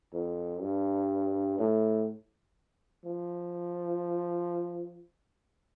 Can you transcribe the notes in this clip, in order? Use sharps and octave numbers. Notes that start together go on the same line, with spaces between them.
F2
G2
A2
F3